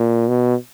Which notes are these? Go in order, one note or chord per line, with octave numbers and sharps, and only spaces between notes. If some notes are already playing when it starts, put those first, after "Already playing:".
Already playing: A#2
B2